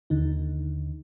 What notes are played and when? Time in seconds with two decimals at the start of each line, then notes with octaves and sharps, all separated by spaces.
0.10 D#2 D3 D#4